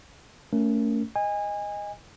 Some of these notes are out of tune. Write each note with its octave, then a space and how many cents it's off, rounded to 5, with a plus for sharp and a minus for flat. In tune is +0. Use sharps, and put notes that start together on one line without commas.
A3 +25 C#4 +20 A#4 +0
D#5 +0 G#5 -25